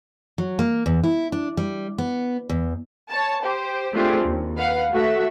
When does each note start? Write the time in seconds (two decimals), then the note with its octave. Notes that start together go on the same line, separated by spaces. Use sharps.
0.38 F#3
0.59 A#3
0.86 E2
1.04 E4
1.32 D4
1.57 G3
1.98 B3
2.49 E2
3.10 C#5 A5
3.42 G4 C5
3.93 A3 C4 D4 F4 G4 G#4
4.25 D#2
4.57 B4 F5 F#5
4.92 A3 F#4 A4 E5